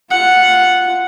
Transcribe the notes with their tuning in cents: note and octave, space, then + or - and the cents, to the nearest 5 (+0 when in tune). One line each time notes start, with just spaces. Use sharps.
F4 +0 F#5 -5